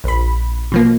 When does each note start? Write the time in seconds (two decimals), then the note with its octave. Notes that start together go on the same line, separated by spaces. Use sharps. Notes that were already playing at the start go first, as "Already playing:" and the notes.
0.04 A#1 B5
0.72 B2 F3 A#3